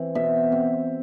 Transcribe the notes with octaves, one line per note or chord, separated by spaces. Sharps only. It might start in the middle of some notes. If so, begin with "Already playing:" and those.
Already playing: E3 C4
B2 E5
C4